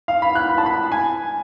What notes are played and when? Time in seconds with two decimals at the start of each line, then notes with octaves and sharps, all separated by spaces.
0.08 F5
0.22 B5
0.35 F#6
0.49 B5
0.58 A5
0.66 B5
0.92 G#5